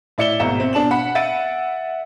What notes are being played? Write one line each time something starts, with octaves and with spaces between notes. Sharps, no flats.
A2 E4 D5 C#7 E7 G7
G#1 B2 E5 A#5 E7
C4
B2 D4 A5 E7 F#7
F#5 B5
E5 F#5 A6 D7 D#7